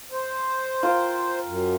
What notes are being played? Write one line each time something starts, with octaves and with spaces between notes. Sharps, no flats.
C5
F4 A#4 G5
F#2